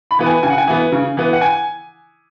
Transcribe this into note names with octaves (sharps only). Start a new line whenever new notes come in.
B5
E3 B3
G#5
C#3 G#5
F#5
G#5
E3 B3
C#3
E3 B3
F#5
G#5